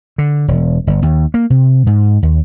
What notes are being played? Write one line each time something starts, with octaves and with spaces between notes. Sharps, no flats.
D3
E1
G1
D#2
A#3
C3
G#2
D#2